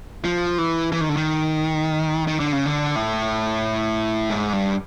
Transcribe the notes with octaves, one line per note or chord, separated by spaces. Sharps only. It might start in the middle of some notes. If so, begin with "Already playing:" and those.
F3
E3
E3
D#3
D3
D#3
D#3
D3
C#3
D3
A2
G#2
G2